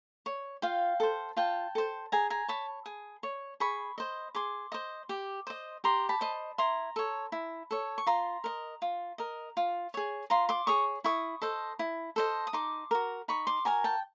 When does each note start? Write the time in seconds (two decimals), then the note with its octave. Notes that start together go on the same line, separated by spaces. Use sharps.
0.26 C#5
0.62 F4 F5 G5
1.00 A4 C5
1.37 F4 G5 A5
1.75 A4 C5
2.12 G#4 G#5 A#5
2.30 G#5 A#5
2.48 C#5 A5 B5
2.86 G#4
3.23 C#5
3.60 G#4 B5 C#6
3.98 C5 D#5
4.35 G#4 C6 D6
4.72 C5 D#5
5.09 G4
5.47 C5 D#5
5.84 G4 A#5 C6
6.09 A5 B5
6.21 C5 D#5
6.58 E4 A#5 C6
6.96 A4 C#5
7.32 E4
7.71 A4 C#5
7.98 C#6
8.06 F4 A#5 C6
8.44 A#4 D#5
8.82 F4
9.18 A#4 D#5
9.57 F4
9.94 G#4 C#5
10.30 F4 A#5 C6
10.49 C6 D6
10.67 G#4 C#5 C#6 D#6
11.04 E4 C#6 D#6
11.42 A4 C5 D#5
11.79 E4
12.16 A4 C5 D#5
12.47 D#6
12.53 D#4 C6 D6
12.91 F#4 A#4
13.28 D#4 B5 C#6
13.47 C6 D6
13.65 F#4 A#4 G#5 A#5
13.84 G5 A5